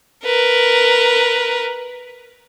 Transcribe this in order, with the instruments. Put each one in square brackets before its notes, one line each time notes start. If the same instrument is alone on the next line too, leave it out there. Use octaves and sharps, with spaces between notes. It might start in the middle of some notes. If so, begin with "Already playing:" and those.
[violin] A#4 B4